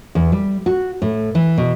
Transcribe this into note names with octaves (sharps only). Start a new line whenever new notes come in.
E2
G3
F#4
A2
E3
B2